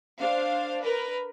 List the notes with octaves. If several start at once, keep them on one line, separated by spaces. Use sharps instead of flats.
D4 C5 F5
A#4 B4